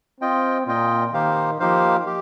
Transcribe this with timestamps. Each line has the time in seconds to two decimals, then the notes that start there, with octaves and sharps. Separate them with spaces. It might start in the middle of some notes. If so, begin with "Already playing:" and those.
0.21 C4 F4 D#5 G5
0.67 A#2 F4 D#5 G5
1.13 D#3 A#3 D#4 G4 C5 F5
1.60 F3 A#3 D#4 G4 C5 F5
2.06 G4